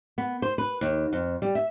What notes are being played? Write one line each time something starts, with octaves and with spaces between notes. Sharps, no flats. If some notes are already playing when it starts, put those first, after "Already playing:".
B3
C5
B4
D#2
F2
G3
E5